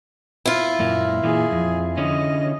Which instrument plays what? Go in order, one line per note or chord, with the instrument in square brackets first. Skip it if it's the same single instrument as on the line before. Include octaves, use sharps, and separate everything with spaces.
[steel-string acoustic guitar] E4 F4
[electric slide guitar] F#2 A#2 A#3
[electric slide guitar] A#2 E3 [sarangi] G#4
[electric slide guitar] F2
[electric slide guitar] D3 C#4 [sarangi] D#5